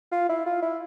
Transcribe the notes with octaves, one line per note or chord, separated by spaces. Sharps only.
F4
E4
F4
E4